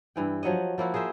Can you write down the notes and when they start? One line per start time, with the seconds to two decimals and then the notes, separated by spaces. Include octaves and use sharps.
0.16 G2 E3 G5
0.43 F3 F#3 C#5 D#5
0.78 F3 A#3 E4 F#4
0.94 G#4 A#4 C5 E5